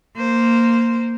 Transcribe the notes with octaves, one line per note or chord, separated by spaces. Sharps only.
A#3 C5